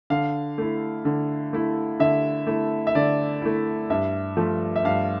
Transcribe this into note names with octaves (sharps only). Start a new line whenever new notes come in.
D3 F5
A3 E4
D3
A3 E4
D3 E5
A3 E4
E5
D3 D5
A3 E4
G2 E5
F3 A3
E5
G2 F5